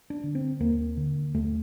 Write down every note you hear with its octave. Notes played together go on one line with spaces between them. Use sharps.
D4
D3
C4
D#2 A#3
D3
D#2 A3